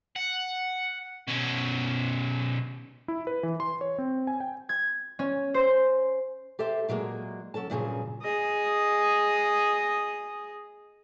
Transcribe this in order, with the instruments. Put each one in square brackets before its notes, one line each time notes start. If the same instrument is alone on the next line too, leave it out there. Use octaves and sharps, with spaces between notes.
[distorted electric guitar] F#5
B2 C#4
[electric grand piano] E4
B4
E3
C6
C#5
C4
G#5
G5
[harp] G#6
C#4
C5
[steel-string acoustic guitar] G4 A4 C5 E5
A#2 F#3 G#3 A#3
F#3 C#4 A4 A5
G2 A#2 C#3 F3 F#3 G#4
[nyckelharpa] G#4 D#5